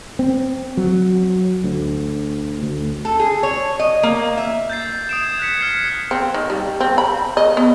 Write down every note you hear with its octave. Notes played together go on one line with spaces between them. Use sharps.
C4
F#3
D2
D2
A4
G#4
C#5
D#5
A#3
E5
G6 A6 C7
D#6 D7 E7
G#6
F#6 G#6 B6 C#7
F6 G#6 C7
C#7
C4
D#3
G3
C4
B5
D#5
B3